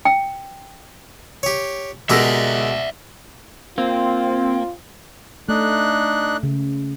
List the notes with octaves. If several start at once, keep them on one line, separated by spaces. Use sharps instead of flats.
G5
G4 C#5
B2 G#3 G4 A#4 D5 E5 E6 A#6
A#3 C4 F4
A3 D4 D#4 F#6
C#3